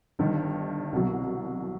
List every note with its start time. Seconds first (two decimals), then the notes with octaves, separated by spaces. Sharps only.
0.19 G1 G2 D#3
0.92 C2 B2 F#3